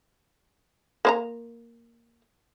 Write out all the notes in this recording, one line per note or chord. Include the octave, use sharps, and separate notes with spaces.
A#3 C5 A#5